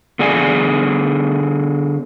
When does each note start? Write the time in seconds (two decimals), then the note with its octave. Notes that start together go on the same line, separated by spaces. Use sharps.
0.19 D3 B3 G#4 D5 F5 G#5